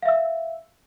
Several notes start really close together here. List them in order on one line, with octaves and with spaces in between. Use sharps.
F5 E5 E6